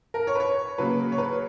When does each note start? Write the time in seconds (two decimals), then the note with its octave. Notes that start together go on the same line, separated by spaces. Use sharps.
0.14 A#4
0.27 C#5
0.35 B4
0.40 C#5
0.78 C#3 F#3 A#3 B4
1.12 C#5
1.18 B4